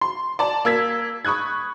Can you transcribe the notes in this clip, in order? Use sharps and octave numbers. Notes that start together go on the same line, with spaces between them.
C6
D5 A5
A#3 E6 G#6 B6
B5 C#6 D#6 F#6 G#6